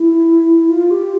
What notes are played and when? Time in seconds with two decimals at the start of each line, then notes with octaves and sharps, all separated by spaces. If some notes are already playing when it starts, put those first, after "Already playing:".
Already playing: E4
0.70 F4
0.91 G4